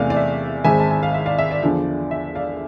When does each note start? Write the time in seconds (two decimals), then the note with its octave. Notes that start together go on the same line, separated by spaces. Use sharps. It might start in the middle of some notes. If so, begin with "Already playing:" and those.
Already playing: E2 C3 E3 A3 D5 F5
0.10 D5
0.16 E5
0.64 G#1 G#2 G#3 C4 E5 G#5
0.80 A5
0.91 G#5
1.03 F5
1.14 E5
1.26 D5 F5
1.38 E5
1.51 D5
1.62 E2 D3 F3
2.11 E5
2.35 D5 F5